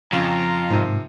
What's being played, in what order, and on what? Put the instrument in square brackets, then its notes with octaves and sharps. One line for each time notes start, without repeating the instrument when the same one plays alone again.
[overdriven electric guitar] F2 [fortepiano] C#3 [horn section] F4 A#5
[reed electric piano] G#2 [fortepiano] C3 D#3 F3